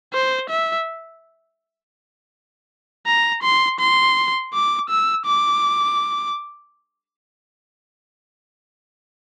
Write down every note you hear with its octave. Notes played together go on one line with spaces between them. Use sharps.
C5
E5
A#5
C6
C6
D6
E6
D6